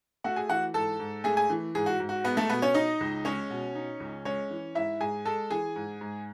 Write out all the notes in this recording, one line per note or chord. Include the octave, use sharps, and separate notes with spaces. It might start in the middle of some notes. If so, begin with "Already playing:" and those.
A3 F#4 F#5
G#4 G#5
E3 F#4 F#5
G#2 A4 A5
G#2
A3 G#4 G#5
G#4 G#5
E3
G#2 G#4
F#4
G#2
F#4
G#3 B3 B4
A3 A4
B2 B3 B4
C#4 C#5
D#4 D#5
C#2
G#3 C#4 C#5
B2
D#4
C#2
G#3 C#4 C#5
E3
G#2 E4 E5
G#2 G#4 G#5
G#3 A4 A5
E3 G#4 G#5
G#2
G#2